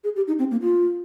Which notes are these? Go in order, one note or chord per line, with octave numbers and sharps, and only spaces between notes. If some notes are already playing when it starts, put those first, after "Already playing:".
G#4
G4
D#4
C4
A#3
F4